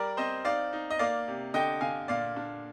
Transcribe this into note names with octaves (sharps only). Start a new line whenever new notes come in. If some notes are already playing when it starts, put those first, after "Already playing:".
Already playing: G3 A#4 D5
C4 C5 D#5
D#4 D5 F5
D#4
D#5
A#3 D5 F5
C3
D3 D#5 G5
D3 F5 G#5
A#2 D5 F5
D4